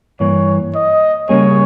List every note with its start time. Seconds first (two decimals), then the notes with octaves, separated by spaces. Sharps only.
0.20 G2 E3 A#3 C#5
0.75 D#5
1.29 C#3 G3 A#3 C#4 G#4 C#5